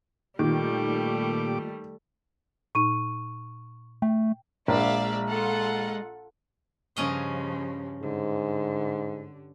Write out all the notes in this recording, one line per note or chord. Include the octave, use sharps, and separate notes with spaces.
A#2 D#3 G3 A3 A#3 F4 G4 D6
A#2 D#4 C#6 D#7
A3 G5
A#1 G#3 D5 E5 F5
F4 A4 F#5
G2 C#3 F3 C#4 D#5
G#2 D3